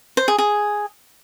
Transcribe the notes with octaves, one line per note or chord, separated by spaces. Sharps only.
C5
G#4
G#4